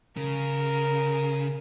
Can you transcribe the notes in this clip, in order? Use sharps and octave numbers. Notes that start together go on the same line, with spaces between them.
C#3 A#4